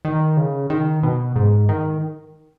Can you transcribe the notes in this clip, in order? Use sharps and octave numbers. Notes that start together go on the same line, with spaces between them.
D#3
C#3
D#3
B2
G#2
D#3